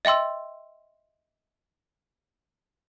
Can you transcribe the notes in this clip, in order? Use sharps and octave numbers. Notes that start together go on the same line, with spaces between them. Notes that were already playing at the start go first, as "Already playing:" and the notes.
D#5 E5 G5 C6 E6